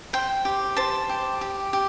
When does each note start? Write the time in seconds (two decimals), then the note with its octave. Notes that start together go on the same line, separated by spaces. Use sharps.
0.13 C5 G5
0.45 G4
0.77 C5 A5
1.09 G4
1.41 G4
1.73 G4